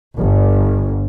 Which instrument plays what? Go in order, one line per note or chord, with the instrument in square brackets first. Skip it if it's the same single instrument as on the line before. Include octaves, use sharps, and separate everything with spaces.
[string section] G1